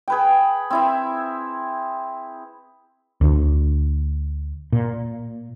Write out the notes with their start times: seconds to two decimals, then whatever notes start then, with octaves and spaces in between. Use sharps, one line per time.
0.08 G#4 B4 G5
0.70 C4 E4 E5
3.21 D2
4.72 A#2